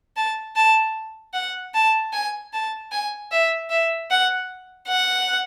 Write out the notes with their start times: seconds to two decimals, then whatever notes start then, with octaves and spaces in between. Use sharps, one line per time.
0.17 A5
0.56 A5
1.34 F#5
1.74 A5
2.13 G#5
2.53 A5
2.92 G#5
3.32 E5
3.70 E5
4.10 F#5
4.88 F#5